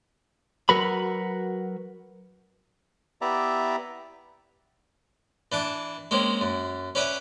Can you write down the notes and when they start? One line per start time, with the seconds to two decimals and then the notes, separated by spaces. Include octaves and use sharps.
0.69 F#3 F#4 A#4 B4 B5
3.21 B3 E4 G4 D5 E5 A#5
5.52 E3 D4 A5
6.11 G#3 A#3 C4 C#4
6.41 F#2
6.95 C#4 B4 D5 E5 F#5